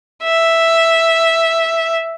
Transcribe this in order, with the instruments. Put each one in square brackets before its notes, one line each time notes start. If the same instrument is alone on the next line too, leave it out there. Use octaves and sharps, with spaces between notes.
[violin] E5